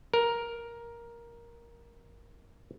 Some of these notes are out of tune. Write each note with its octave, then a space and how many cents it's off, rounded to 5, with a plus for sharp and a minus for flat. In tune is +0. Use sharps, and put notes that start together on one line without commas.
A#4 +10